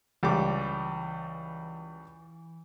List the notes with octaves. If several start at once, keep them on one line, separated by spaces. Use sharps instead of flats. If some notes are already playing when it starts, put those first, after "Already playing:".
C#2 E3 G3 D6